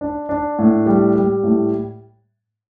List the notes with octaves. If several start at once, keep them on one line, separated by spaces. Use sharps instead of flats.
D4
D4
A2
G3
G3
A2